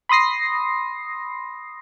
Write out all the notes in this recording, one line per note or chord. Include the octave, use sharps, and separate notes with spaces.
B5 C6 D#6 A#6 C7